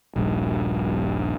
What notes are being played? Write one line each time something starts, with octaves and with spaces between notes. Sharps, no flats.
D#1 A#1 G2